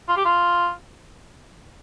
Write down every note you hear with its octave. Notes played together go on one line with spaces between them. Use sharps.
F4
G4
F4